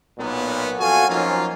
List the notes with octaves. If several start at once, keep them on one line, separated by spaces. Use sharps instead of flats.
B1 A#2 B3
F2 F#4 A4 F5 G#5
F3 F#3 A#3 C#4 D#4 F4